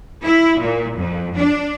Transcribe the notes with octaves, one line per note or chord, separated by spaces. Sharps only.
E4
A#2
F2
D4